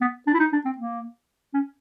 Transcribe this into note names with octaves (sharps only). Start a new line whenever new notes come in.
B3
D4
E4
D#4
D4
C4
A#3
C#4